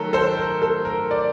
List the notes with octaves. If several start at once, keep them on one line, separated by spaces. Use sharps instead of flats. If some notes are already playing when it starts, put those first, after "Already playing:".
Already playing: D#3 F#3 A3 A4 A#4
A4 C5
A#4
A4
A#4
D5